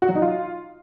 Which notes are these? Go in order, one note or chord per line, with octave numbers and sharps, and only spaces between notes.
F#4
F#3
D#4
F4